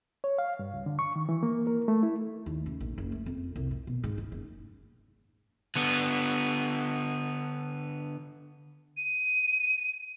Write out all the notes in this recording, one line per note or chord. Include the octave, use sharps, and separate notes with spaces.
C#5
F5
G2
C#2
D3
C#6
D#3
E3
A#3
A#4
A3
E4
D#2
C#3
A#1
F#1
A3
F2
C2
A2
B2
G#2
E4
F#1
D3 B3
D#7